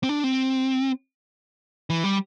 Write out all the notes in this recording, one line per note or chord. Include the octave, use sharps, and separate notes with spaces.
C4
D4
C4
E3
G3